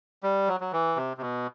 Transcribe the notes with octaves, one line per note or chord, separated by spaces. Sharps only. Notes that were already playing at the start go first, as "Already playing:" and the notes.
G3
F#3
F#3
E3
C3
C3
B2